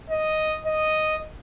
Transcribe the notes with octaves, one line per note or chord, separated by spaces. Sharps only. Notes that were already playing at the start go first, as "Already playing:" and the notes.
D#5
D#5